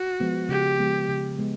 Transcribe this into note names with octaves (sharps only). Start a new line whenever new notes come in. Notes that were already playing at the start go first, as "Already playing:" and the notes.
Already playing: F#4
F3 G#3 B3
C#3 G4
F3 G#3 B3
C#3
G#3 B3